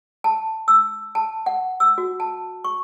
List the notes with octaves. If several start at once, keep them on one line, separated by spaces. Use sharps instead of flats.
A5
E6
A5
F#5
E6
F#4
A5
C#6